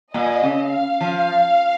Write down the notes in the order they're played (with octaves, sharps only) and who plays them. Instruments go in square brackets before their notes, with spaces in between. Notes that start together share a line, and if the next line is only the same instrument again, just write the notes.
[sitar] A#2 [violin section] D#5
[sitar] C#3
[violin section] F5
[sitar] F3